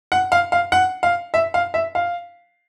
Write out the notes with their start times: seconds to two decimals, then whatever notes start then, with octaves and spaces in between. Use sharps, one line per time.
0.12 F#5
0.32 F5
0.52 F5
0.72 F#5
1.03 F5
1.34 E5
1.54 F5
1.74 E5
1.95 F5